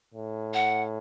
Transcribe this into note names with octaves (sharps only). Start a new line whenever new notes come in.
A2
F#5